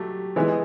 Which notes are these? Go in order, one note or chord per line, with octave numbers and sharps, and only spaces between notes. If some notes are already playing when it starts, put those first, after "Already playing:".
Already playing: F#3 A3 G4
E3 G#3 B3 E4